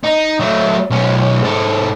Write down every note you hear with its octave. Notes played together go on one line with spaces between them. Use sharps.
D#4
F#3 A3
B1 C#4
G#2 A4